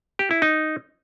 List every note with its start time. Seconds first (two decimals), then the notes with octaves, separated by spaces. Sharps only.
0.19 G4
0.31 E4
0.42 D#4